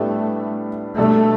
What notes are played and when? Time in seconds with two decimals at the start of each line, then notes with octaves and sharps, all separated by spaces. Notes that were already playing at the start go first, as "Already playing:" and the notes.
Already playing: A2 G3 A3 B3 D4 G4
0.98 B2 G3 A3 D4 A4